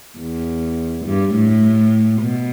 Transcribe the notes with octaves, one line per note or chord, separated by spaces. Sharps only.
E2
G2
A2
B2